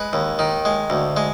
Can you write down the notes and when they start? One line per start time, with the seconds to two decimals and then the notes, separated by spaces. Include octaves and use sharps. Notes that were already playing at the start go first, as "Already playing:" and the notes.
Already playing: G#3 B4
0.13 D#2
0.39 D#3
0.65 G#3
0.90 D2
1.17 G#3